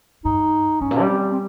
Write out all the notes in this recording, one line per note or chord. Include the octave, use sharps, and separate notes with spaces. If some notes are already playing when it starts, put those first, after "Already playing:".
G2 D#4
G#2 C#4
A#2
G3
C4
C4